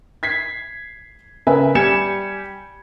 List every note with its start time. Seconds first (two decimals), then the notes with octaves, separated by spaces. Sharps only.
0.23 G#6 B6 C7
1.47 C#3 A#4 B4 E5 G#5
1.75 G3 G4 G#5 G#6 C#7 E7